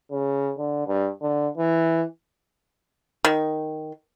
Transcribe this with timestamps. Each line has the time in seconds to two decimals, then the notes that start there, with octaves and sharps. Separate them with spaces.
0.11 C#3
0.58 D3
0.87 G2
1.21 D3
1.57 E3
3.24 D#3